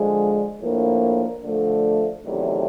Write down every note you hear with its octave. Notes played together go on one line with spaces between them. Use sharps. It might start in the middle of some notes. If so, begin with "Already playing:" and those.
Already playing: D3 F3 G#3
A2 F3 A#3 D4
D3 F3 A3
E2 C3 D#3 F#3 A3